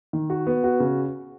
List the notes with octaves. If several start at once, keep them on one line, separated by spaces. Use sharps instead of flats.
D#3
F#4
B3
F#4
C#3